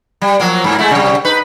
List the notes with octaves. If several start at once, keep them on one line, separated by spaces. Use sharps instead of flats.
G3
F3 F#3 A#3
G#2 A#3
G#3 A3 E4
C3 G3
D#4 B4